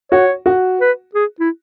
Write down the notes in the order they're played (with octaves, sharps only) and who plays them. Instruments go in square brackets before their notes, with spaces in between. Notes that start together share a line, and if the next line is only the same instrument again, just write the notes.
[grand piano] F#4 [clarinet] C#5
[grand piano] F#4
[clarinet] B4
G#4
E4